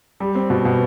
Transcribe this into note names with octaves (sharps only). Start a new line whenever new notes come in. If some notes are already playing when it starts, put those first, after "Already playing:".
G3
C4
B2
B2